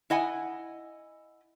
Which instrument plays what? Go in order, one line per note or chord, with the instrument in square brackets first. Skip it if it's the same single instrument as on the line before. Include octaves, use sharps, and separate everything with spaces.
[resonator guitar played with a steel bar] E4 D#5 F#5 G#5